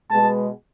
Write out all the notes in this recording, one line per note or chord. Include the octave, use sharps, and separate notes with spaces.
B2 G#3 B3 A5